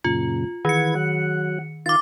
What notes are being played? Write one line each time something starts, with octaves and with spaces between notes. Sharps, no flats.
F#2 A#2 C#3 F4
D#3 E3 B4 G#6 C#7
F#3 F#5
D#3 F4 F5 D6 A6